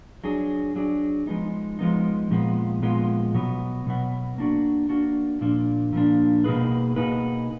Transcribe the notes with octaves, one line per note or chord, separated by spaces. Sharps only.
F#3 D4 G#4
F#3 D4 G#4
F3 G#3 B3 D#4
F3 G#3 B3 D#4
A#2 F3 G#3 B3 F4
A#2 F3 G#3 B3 F4
B2 F#3 B3
B2 F#3 B3
A#3 D4 F#4
A#3 D4 F#4
A#2 F3 A#3 D4
A#2 F3 A#3 D4
B2 A#3 D#4 G#4 B4
B2 A#3 D#4 G#4 B4